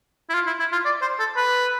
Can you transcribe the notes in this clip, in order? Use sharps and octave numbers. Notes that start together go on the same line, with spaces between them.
E4
F4
E4
E4
F4
D5
C5
A4
B4